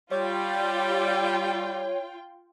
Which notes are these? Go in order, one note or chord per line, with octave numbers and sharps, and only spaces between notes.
G3 F4 C#5 G5